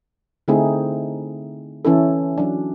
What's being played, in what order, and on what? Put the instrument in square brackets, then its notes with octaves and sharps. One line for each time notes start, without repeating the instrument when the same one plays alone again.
[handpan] D3 A3 C4 D#4 E4 G#4
E3 C#4 E4 A4
F#3 D4